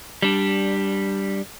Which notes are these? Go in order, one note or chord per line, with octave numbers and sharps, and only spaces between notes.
G3 D4